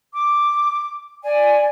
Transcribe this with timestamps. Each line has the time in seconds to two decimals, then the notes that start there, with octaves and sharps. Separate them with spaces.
0.13 D6
1.23 D5 G#5